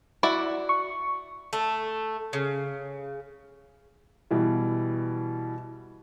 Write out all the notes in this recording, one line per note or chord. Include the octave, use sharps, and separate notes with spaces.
E4 F#4 D5
C#6
A3
C#3
B2 E3 G3